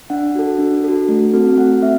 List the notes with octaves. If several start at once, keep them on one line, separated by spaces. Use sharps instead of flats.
D4 F#5
F#4 A4
D4
F#4 A4
A3
C4 F#4 A4
A3 F#5
C4 E5